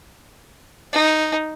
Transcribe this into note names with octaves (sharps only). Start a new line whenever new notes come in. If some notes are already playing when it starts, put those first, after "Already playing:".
D#4